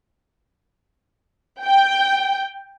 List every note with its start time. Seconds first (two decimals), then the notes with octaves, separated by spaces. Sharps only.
1.63 G5